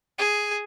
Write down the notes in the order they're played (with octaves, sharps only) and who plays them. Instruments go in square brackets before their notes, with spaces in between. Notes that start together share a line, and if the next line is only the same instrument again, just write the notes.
[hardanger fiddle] G#4